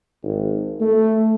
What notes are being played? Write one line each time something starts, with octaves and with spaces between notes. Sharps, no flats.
G#1
A3